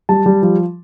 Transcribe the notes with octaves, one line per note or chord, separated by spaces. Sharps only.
G3 A5
G3
F3